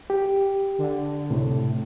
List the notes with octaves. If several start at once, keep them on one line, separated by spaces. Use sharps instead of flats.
G4
D3
C#2 A2 C3